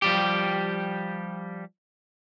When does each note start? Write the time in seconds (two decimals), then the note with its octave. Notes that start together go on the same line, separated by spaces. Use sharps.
0.02 F3 G3 G4